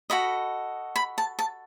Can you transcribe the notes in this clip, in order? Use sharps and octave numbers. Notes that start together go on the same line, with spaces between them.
F#4 A4 D#5 B5
B5
A5
A5